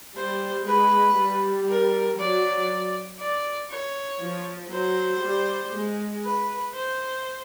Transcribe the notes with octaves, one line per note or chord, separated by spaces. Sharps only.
G3 C5
G#3 B4
G3
A#4
F#3 D5
D5
C#5
F3
F#3 C5
G3
G#3
B4
C5